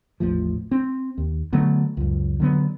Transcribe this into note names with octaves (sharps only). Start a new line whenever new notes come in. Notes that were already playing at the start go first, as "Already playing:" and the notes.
A1 E2 A2 F3
C4
D#2
D3 F#3 A3 B3
C#2 F#2
D3 F#3 B3